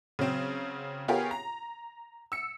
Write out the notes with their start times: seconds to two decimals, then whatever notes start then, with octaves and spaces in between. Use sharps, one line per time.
0.19 C#3 F#3 C4
1.08 B3 F4 G4 G#4 A#4 C#5
1.31 A#5
2.32 E6 C#7